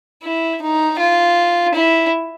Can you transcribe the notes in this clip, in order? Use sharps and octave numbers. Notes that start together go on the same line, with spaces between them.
E4
D#4
F4
E4